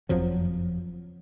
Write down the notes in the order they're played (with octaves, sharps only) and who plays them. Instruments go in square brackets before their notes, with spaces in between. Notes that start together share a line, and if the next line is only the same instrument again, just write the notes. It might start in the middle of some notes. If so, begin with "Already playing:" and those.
[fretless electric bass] F#1 F2 F3 F#3